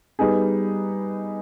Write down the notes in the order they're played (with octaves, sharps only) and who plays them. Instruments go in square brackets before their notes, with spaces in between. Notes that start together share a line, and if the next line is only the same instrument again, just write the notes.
[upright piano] G3 B3 D#4 G#4